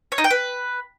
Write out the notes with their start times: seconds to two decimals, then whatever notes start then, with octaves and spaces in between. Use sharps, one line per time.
0.12 C#5
0.18 D#4
0.24 G5
0.30 B4